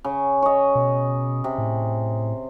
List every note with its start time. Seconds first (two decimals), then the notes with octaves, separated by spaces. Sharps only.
0.04 C#3
0.42 C#5 D#5
0.75 B2
1.44 C3
1.58 A2